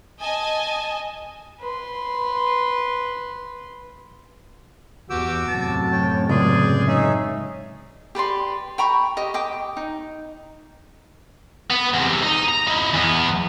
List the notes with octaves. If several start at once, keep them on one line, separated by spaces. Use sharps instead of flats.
D#5 G#5 A5
B4 C6
E2 F#4 G4 D6 E6
F#2 A2 C3 A5
C#5 G5
C#2 G#4 D5 G6
C#4 D#4 E5
G4 B4 D5 C6
G5 A#5 B5 C#6
G4 D#5
D#5 G5 D6
D#4
B3
E2 C3
D#4
A#5
D#4 E4
E2 B3